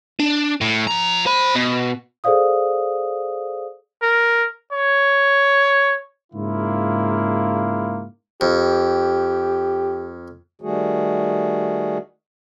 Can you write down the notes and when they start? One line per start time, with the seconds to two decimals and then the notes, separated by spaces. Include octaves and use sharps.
0.20 D4
0.61 A2
0.87 F3 A#5
1.26 C5 B5
1.55 B2
2.24 G#4 A4 C5 D5 F5 D#6
4.02 A#4
4.72 C#5
6.33 G#2 C#3 A#3 E4 F4
8.41 F2 G4
10.62 D#3 G3 A3 F#4 G#4